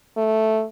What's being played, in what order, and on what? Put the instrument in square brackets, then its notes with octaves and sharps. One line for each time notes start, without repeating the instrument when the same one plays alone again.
[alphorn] A3